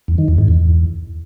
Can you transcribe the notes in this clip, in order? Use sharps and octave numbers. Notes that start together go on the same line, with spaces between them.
E2
D#3
E2
G#2
E2